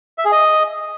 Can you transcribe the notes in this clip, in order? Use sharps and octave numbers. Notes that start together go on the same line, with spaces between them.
E5
G#4
D#5